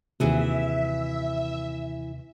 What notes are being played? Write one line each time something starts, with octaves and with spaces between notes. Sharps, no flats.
D#2 C3 E3 F#4 G#4 E5